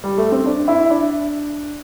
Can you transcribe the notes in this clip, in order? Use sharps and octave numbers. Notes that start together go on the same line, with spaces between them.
G3
A3
C4
D4
E4
D4